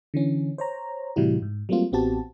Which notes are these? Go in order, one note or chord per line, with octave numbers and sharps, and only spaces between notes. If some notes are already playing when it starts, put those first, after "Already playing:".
D3 E3 C#4
C5 C#5 A#5
A2 C3 E3 G3 E4 F#4
G#2
F#3 G3 A3 A#3 C4 F4
A1 B3 C4 F#4 G4 A5